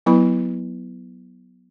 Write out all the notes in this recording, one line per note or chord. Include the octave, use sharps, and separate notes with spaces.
F#3 B3 E4 B4 B5